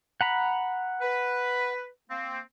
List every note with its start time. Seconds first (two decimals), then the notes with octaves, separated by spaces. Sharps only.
0.21 F#5 A#5 B5
1.02 B4
2.09 A#3 C4